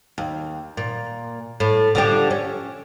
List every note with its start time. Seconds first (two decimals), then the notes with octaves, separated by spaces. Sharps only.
0.18 D#2
0.77 A#2
1.60 A2
1.95 D3 F3 G4
2.31 C#4